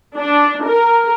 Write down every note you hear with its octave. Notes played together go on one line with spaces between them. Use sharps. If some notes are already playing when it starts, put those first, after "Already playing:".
D4
A#4